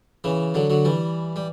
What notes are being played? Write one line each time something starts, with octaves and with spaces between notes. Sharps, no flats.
C#3 E3
D3 F#3
D3 F#3
E3 G3
G3